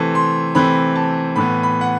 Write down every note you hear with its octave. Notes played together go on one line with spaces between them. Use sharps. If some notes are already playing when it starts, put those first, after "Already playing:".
Already playing: C3 E3 A3 C4 A5
C6
C3 E3 A3 C4 B5
A5
A2 E3 B3 B5
B5
F#5